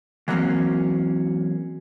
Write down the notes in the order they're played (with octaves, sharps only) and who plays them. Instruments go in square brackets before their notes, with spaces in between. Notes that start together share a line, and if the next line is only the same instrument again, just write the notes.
[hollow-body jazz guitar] E3 F#3 G#3 A#3 C4 C#4